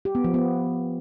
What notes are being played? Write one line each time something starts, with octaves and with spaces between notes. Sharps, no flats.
G4
B3
F3
B3